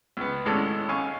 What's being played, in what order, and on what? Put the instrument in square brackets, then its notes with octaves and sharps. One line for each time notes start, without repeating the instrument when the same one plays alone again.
[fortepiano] C#2 B3
G#1 A2 G#3 C#4 A4 D5
G#1 C#4 F5 G#5 C#6